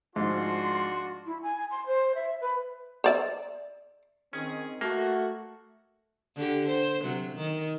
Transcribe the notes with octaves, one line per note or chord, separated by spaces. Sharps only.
G#2 F3 D4 F4 F#4 C6
E4
G#5
C6
C5
E5
B4
C5 D5 E5
D#3 C4 C#4 G#4
A3 A#3 F#4
D3 G4
C5
C3 F#3
D#3